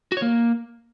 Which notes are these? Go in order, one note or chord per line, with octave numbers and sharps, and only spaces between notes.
F#4
C#5
A#3